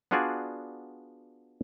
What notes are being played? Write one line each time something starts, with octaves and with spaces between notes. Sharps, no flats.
B3 D4 F4 F#4 G#4 D5